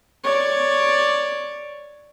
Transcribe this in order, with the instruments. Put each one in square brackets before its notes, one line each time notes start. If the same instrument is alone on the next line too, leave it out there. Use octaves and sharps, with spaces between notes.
[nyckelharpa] C#5 D5